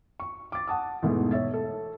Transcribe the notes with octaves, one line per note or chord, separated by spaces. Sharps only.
C#6
D6 A6
F#5 A5 D#6
E2 G#2 B2 A3
C#5 E5 A6
A4